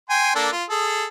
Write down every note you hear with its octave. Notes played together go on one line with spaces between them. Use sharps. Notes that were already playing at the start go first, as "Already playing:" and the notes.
G5 G#5 C6
A#3 D4 A4
F4
G#4 A4